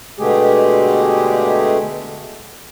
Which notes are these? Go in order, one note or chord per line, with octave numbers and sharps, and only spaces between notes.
B2 D3 G#3 A3 G4 G#4